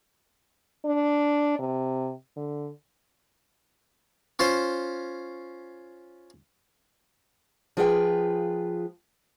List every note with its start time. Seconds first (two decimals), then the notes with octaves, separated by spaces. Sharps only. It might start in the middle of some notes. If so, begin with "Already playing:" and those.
0.85 D4
1.59 C3
2.37 D3
4.39 C#4 F4 C5
7.77 F3 F4 G#4 B4 F#5 G5